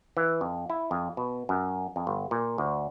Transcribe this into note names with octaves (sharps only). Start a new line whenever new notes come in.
E3
F2
E4
F2
B2
F#2
F2
G1
A#2
D2